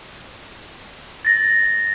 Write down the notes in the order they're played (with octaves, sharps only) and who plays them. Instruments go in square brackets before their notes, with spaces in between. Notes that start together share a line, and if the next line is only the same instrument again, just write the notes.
[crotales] A6 A#6